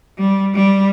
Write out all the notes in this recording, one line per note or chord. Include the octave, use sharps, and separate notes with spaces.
G3
G3